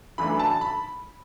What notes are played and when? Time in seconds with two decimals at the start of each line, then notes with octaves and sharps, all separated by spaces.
0.18 F#2 E3 A3 D4 B5
0.40 A5
0.61 B5